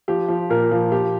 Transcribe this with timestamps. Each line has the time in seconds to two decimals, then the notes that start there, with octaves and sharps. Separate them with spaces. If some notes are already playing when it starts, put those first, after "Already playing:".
0.08 F3 G4
0.28 F3
0.50 A#2 A#4
0.71 F3
0.92 F3 G4